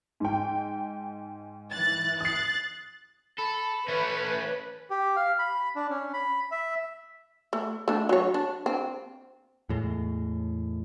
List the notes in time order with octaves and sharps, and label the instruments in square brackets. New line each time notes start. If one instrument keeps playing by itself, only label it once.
[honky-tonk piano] G#2 G5
[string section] E3 F#6 A6
[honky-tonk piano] D#6 C7 [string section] F#6 A6
[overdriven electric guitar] A4 [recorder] B5
[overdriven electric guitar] A3 C#4 [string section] B4
[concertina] G4
F5
B5
D4
C#4
B5
E5
[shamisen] A3
A3 D4
F#3 C#5
D4
C4
[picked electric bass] E2 A2 G#3